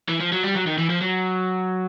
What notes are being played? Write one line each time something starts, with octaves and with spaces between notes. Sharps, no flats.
E3
F3
F#3
G3
F#3
D#3
E3
F3
F#3